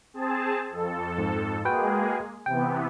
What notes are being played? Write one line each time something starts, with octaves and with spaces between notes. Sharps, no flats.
C4 G#4 A5
F2 A4
G#2
G#3 A#3 F#4 G#4 B4 G5
C3 E3 B3 G5